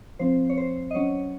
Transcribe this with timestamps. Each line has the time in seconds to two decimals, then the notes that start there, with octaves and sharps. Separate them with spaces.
0.19 F3 C4 C5
0.49 C#5
0.57 C5
0.91 D#5
0.95 F#3 C#4 C#5